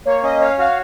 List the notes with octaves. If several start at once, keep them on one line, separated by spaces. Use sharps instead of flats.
A#3 C#5
C#4 D#5
C#5 F5
F#4 F5